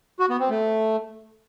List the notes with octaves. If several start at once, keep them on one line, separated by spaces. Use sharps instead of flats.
F#4
B3
C4
A3